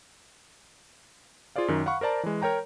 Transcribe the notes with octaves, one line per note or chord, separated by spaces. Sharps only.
F4 G#4 C5 D5 F5
F#2 D#3
F5 F#5 B5 C#6
A#4 C5 D5 A5 A#5
E3 G#3
A#4 C#5 G5 A#5